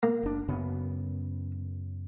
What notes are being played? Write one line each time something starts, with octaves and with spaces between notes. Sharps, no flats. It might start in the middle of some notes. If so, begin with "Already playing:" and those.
A#3
F#1 D4
F#2 C#3 B3